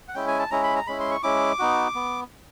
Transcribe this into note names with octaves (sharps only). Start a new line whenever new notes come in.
F#5
G#3 C#4 E4 G5
G#5
A5
G#3 C#4 E4 A#5
B5
A#5
G#3 C#4 E4 B5
C6
C#6
G#3 C#4 E4 D6
B3 D#4 F#4
B3